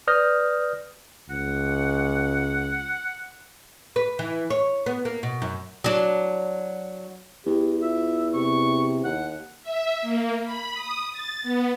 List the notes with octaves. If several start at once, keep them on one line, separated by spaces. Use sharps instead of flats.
B4 D5 D#6 F6 G6 A#6
C#2 F#5
B4
E3
C#5
B3
A#3
B2
F#2
F#3 D4
E2 G4
F4 E5
C3 C#6
D#2 F#5
E5
A#3
B5
D#6
A6
B3